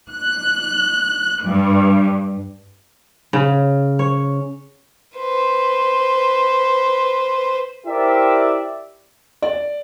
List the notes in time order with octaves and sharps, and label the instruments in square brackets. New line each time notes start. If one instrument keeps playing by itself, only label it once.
[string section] F#6
G2
[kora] C#3
C#5
[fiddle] B4 C5
[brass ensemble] E4 G4 A#4 C5 D5 E5
[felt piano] D5